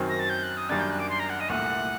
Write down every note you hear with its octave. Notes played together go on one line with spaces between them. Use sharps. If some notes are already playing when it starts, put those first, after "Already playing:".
Already playing: F#2 D#3 F#3 C4
A#6
A6
G6
F#6
D#6
F#2 D#3 G3 A#3 D4 A6
G6
F#6
D6
C6
A#5
F#5
D#5
C2 A#2 A3 F#5